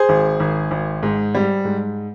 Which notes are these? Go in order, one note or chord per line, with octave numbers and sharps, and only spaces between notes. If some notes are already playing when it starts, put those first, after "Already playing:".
Already playing: G#4 C5
G#1
G#1
G#1
G#2
G3
G#2